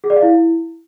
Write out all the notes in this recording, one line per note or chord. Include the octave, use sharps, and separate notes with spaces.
G#4
D5
F5
E4